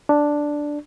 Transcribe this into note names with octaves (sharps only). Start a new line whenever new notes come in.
D4